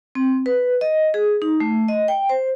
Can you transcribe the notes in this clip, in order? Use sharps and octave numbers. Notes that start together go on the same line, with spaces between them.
C4
B4
D#5
G#4
D#4
A3
D#5
G5
C5